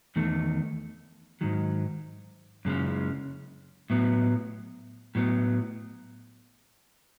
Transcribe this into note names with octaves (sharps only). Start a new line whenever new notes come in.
E2 D#3 A3
G#2 D#3 F#3
F#2 C#3 G#3 C#4
A2 F#3 B3
A2 F#3 B3